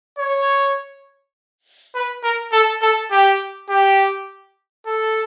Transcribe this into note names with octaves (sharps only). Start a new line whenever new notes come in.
C#5
B4
A#4
A4
A4
G4
G4
A4